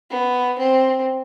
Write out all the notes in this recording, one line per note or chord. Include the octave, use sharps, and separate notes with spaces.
B3
C4